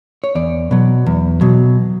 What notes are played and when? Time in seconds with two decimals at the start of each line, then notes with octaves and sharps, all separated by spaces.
0.24 C#5
0.35 E2 D5
0.71 B2 F#3
1.06 E2
1.41 B2 F#3